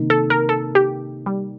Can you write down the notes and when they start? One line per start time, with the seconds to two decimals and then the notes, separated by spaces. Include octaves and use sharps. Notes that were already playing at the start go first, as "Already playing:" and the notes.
Already playing: C3 D#3 A#3 D#4
0.10 A4
0.30 A#4
0.49 A4
0.75 G4
1.26 G3